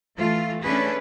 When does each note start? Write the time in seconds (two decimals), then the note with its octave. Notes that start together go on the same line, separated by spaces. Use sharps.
0.18 E3 A3 F4
0.65 A3 C#4 D4 G#4 B4